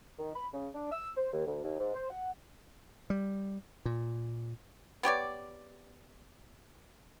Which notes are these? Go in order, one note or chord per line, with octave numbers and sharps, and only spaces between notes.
D#3
B5
C#3
D4
E6
C5
D#2
D2
D#2
G#2
C5
F#5
G3
A#2
B3 G4 C#5 D5